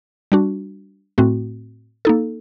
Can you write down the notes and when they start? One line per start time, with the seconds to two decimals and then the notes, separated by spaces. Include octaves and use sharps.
0.32 G3 D4 F#4
1.18 A2 A3 C4 F#4
2.05 A#3 D#4 A4